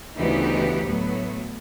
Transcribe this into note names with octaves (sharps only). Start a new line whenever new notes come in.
D2 C#3 E3 B3 D#4 G4
A2 F#3 B3